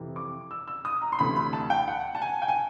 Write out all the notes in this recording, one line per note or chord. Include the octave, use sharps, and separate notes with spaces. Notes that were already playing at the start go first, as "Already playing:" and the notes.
Already playing: F2 C3 E3
D6
E6
E6
D#6
A#5
C6
D2 C3 E3 B5
B5
A5
G5
F#5
A5
G#5
G5
G#5